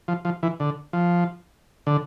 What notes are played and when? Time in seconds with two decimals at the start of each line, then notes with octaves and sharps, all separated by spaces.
0.08 F3
0.25 F3
0.43 E3
0.60 D3
0.93 F3
1.87 D3